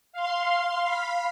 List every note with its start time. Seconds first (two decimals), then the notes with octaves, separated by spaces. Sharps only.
0.12 F5 C6
0.81 F5 B5